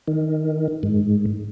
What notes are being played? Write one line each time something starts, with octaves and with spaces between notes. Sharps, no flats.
D#3
G#2